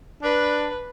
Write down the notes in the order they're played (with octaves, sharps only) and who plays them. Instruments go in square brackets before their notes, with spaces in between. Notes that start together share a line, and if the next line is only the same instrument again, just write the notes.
[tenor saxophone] D4 [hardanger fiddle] B4